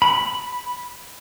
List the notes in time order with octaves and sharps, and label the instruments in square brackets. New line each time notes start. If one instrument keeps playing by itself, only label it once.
[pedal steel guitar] B5